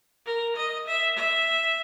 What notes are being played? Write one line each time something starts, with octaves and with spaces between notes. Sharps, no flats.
A#4
D#5
E5
E5